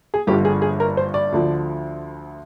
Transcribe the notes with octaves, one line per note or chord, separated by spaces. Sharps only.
G#4
G1 G2 D3 F3 G4
G#4
G#4
A#4
C5
D5
D2 D3 F3